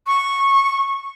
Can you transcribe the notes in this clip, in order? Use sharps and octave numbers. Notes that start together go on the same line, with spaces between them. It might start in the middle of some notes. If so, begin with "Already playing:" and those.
C#6